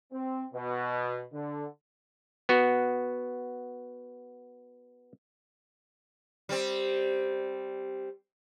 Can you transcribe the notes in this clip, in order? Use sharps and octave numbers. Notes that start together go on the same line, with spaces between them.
C4
B2
D3
B3 F#4
G3 C4